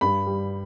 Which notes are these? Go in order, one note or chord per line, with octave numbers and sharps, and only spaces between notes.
G2 B5
G3